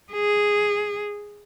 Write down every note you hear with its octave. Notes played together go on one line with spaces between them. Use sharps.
G#4